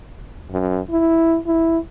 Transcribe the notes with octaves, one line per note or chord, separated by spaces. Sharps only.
F#2
E4
E4